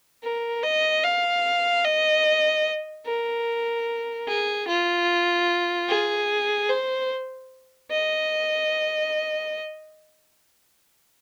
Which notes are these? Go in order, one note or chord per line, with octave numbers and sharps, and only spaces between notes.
A#4
D#5
F5
D#5
A#4
G#4
F4
G#4
C5
D#5